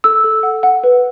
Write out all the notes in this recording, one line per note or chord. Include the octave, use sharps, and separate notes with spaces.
A4 E6
A4
F#5
F#5
B4